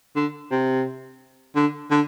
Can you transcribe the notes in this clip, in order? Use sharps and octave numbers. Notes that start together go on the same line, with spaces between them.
D3
C3
D3
D3